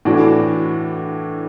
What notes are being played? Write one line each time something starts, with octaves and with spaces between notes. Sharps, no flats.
A2 E3 D4 F#4